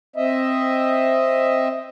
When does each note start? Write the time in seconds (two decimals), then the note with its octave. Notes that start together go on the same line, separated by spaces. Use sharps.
0.16 C4 D#5 E5